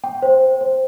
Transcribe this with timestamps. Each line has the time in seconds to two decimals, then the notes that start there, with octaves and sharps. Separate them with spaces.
0.04 G5
0.22 C5
0.41 C5
0.61 C5